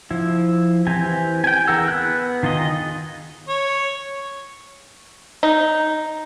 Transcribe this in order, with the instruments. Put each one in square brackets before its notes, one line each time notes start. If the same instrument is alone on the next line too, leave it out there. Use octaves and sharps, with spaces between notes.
[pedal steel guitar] F3 E4
E3 C4 G4 G#5
G5 G#5
E3 G#4 A#4 F#5 E6
B3 F#6
D#3 F4 G#4 D#5
[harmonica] C#5
[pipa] D#4